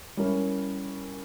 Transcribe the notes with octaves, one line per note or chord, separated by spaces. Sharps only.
G3 C#4 E4 A#4